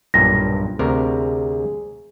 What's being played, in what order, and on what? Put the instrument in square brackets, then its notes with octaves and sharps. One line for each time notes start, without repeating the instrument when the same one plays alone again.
[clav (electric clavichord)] B1 G2 A#2 [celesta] A#6
[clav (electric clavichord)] D2 C3 A#4 [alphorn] G#4